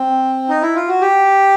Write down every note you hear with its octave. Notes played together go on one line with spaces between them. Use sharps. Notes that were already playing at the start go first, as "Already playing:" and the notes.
Already playing: C4
D#4
E4
F4
F#4
G4